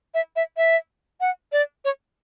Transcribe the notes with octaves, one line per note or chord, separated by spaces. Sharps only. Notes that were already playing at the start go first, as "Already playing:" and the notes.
E5
E5
E5
F#5
D5
C#5